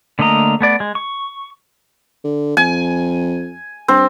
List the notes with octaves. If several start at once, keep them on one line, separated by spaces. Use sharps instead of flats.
D3 A3 A#3 D#5 A#5
A3 B3 D5
G#3
C#6
D3
F2 G#5
G2 C4